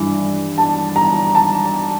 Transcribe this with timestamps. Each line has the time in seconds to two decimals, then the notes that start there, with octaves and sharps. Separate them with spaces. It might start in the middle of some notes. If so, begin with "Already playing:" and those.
Already playing: G2 E3
0.58 A5
0.96 A#5
1.35 A5